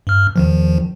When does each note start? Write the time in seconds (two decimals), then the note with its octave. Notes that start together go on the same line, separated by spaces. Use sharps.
0.07 G2 F6
0.36 E2 D#3 F3